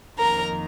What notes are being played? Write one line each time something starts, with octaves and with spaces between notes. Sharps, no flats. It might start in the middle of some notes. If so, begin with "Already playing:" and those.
F2 D#3 A#3 D#4 A#4 A#5